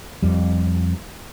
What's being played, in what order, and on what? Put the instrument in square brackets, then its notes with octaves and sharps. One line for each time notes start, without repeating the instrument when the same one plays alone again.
[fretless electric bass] F2 G3